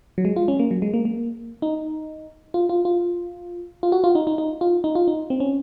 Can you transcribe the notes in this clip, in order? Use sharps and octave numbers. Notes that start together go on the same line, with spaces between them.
F#3
G#3
F4
C#4
A#3
F#3
G#3
A#3
A#3
D#4
F4
F4
F4
F4
F#4
F4
D#4
D#4
D#4
F4
D#4
F4
D#4
C4
C#4